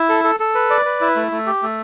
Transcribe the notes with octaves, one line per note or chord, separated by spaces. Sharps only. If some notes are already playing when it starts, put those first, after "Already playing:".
Already playing: E4
A4
A4
A4
B4
D5
B4
E4
A3
A3
G4
A3